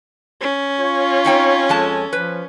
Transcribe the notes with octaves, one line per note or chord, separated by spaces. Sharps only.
C#4
F4 C#5
C4 D#4 G5
F2 G#3 A4 A5
F3 B4